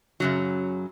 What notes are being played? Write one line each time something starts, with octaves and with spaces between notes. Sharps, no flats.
F#2 C#3 F#3